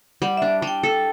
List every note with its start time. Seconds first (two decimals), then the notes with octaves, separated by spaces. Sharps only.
0.22 G3 F#5
0.37 D4 E5
0.62 G3
0.67 G5
0.83 A4